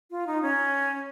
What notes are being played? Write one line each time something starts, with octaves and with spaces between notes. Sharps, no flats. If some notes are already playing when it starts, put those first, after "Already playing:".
F4
D#4
C#4